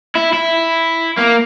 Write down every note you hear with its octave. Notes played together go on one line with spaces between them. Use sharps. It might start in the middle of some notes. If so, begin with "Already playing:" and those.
E4
E4
A#3